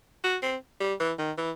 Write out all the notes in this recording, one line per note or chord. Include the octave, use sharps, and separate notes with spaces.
F#4
C4
G3
E3
D#3
E3